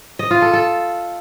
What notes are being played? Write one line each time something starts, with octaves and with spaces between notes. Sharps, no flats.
D#5
F4
A4
A4